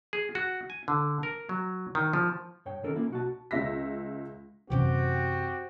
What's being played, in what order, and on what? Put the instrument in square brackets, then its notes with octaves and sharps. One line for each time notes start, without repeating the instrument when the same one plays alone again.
[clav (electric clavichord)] G#4
F#4
G#5
D3
A#4
F#3
D#3
F3
[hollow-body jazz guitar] G2 C#5 G5
D3 D#3 C4 C#4 A4 A#4
A#3 C#4 E4 F4
B1 F#4 A5
[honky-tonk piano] C#2 E5 A#6 B6
[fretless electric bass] F#2 C3 E3 [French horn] C4 [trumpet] F#4 [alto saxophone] G4